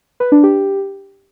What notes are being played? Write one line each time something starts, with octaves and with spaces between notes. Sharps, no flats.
B4
D4
G4